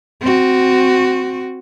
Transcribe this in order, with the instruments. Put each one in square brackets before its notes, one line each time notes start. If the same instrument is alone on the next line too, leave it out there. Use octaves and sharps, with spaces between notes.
[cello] C4 F#4